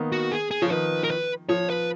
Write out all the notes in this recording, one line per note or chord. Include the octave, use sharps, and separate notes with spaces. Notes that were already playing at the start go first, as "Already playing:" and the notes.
Already playing: D#3 A#3 B3
F#4
G#4
G#4
F3 C#5
D#3 B4
A#4
B4
F3 C#5
B4